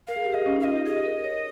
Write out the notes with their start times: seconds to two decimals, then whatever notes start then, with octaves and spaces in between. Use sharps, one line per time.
0.08 A#4 F5
0.16 G#4
0.25 G4
0.32 G#4 D#5
0.46 C#4
0.56 D#4 F5
0.64 F4 D#5
0.76 G4
0.86 G#4 D#5
1.05 A#4
1.24 C#5